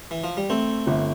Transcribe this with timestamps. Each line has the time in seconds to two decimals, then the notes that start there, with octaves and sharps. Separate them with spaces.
0.11 E3
0.24 F3
0.37 G3
0.50 A3 C4
0.87 G1